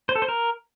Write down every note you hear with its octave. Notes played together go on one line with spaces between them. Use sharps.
C5
A4
C5
A#4